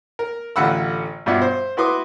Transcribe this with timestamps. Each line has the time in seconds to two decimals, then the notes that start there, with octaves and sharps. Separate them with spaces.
0.19 A#4
0.56 A1 D3 F4 F#5 B5 E6
1.26 G2 B2 F3 D5 E5 F#5
1.42 C5
1.77 E4 F#4 B4 C6 D6 D#6